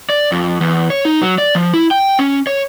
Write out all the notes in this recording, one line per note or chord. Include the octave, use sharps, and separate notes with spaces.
D5
F2
E2
C#5
D#4
F#3
D5
F3
E4
G5
C#4
C#5